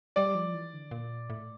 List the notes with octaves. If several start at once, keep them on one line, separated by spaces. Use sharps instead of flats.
G3 D5
F3
E3
D3
A#2
A2